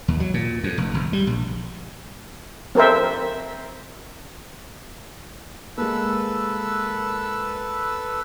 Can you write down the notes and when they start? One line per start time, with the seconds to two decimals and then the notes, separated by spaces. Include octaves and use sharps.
0.08 D#2
0.20 F#3
0.34 A#2
0.64 F2
0.78 F1
0.94 G1
1.13 G3
1.27 A#1
2.75 C4 A4 A#4 C5 E5
5.78 G#3 A#3 A4 B4 E6